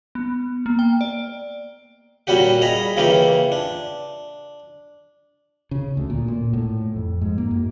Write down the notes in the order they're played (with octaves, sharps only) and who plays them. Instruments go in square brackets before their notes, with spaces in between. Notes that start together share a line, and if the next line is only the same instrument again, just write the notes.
[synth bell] B3
A#3
G5
D5
[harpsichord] A#2 G3 C#4 F#4 G4
G#4 D#5 A#5 B5
C#3 E3 A#3 F4 G4
D4
[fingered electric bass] C#3
D2
A#2
A#2
A2
F2
G#2
A#3
F#2